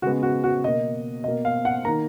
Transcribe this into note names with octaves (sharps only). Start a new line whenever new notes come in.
C#3 G#3 B3 F#4
F#4
F#4
B2 A#3 D#5
B2 A#3 D#5
F5
F#5
D#3 A#3 A#5